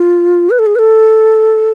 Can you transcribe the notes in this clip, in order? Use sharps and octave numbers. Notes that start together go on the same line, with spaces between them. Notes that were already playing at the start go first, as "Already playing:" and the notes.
Already playing: F4
B4
A4
G#4
B4
A4